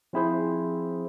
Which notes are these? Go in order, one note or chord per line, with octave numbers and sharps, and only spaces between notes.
F3 C4 E4 G#4 C5